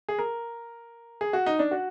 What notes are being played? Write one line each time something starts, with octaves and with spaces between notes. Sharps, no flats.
G#4
A#4
G#4
F#4
D#4
D4
F#4